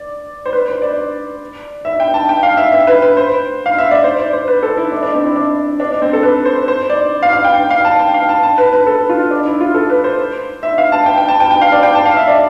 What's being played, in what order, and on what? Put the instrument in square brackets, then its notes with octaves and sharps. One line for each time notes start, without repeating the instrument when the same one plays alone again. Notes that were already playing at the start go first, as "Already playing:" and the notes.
Already playing: [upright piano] D5
C5
B4
C5
D5
E5
G5
A5
G5
F5
E5
E5
B4
B4
C5
F5
E5
D5
C5
D5
C5
B4
A4
E4
D4
D4
C4
E4
D4
D4
D4
C4
A4
B4
C5
C5
D5
F5
F5
G5
G5
F5
A5
G5
F5
A5
A5
B4
B4
A4
F4
D4
E4
F4
A4
B4
C5
E5
F5
A5
G5
G5
A5
G5
G5
F5
D5
G5
A5
F5
E5
D5